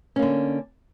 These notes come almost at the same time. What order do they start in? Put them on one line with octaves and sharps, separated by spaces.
C#4 A#3 D3